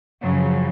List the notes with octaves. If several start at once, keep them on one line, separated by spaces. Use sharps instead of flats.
F#2 C#3 F3 F#3